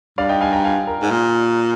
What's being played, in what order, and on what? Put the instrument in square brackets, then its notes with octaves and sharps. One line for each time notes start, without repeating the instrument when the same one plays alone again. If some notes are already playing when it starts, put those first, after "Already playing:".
[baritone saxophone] G2 [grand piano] D5 F5
[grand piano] D#5 G5
F5 G#5
G5 A#5
F5 G#5
A#4
[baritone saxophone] G#2
A#2